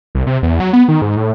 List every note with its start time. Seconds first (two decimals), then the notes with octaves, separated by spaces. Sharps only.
0.15 C2
0.27 C3
0.42 E2
0.60 F#3
0.73 B3
0.88 D#3
1.02 G#2
1.17 A2